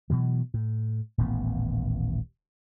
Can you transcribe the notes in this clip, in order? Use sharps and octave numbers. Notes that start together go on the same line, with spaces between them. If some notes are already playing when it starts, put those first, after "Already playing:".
B2 E3 F#3
A2
D#1 A1 A2 B3